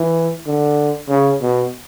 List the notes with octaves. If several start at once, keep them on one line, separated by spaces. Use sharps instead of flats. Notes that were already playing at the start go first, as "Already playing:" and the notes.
Already playing: E3
D3
C#3
B2